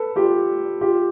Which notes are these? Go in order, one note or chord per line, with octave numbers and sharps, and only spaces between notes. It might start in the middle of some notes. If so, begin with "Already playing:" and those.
Already playing: A4 B4
F4 G4
F4 G4